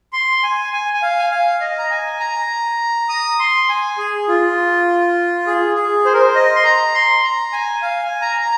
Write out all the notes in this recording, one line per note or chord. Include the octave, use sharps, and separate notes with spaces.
C6
G#5
G#5
G#5
F5
G#5
F5
D#5
A#5
G#5
A#5
D#6
C6
G#5
G#4
F4
G#4
G#4
C5
A#4
C5
D#5
C6
A#5
C6
A#5
G#5
F5
G#5
A#5
A#5